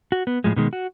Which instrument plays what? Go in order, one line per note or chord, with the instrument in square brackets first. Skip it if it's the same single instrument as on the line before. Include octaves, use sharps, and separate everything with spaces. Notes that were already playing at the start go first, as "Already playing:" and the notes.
[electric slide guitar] F#4
B3
A2 F3 G#3
B2 D#3 G#3
F#4